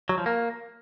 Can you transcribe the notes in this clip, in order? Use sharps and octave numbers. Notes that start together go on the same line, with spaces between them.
F#3
F3
A#3